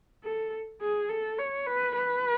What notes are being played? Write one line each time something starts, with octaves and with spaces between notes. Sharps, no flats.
A4
G#4
A4
C#5
B4
B4